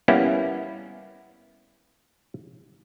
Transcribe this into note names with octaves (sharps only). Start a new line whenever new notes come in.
G3 A#3 B3 C#4 E4